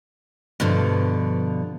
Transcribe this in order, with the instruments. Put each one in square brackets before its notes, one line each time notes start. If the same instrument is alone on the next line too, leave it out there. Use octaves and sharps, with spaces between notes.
[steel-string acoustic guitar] G2 B2 D3 F3